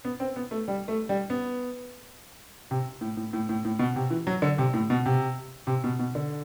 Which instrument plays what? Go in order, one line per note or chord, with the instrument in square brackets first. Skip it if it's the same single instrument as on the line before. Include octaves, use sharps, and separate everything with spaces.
[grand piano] B3
C4
B3
A3
G3
A3
G3
B3
C3
A2
A2
A2
A2
A2
B2
C3
E3
F#3
D3
C3
A2
B2
C3
C3
B2
B2
D3